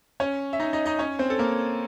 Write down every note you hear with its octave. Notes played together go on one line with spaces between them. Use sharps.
C#4 C#5
E5
D#4 D#5
D#4 D#5
D#4 D#5
C#4 C#5
C4 C5
A4
A#3 A#4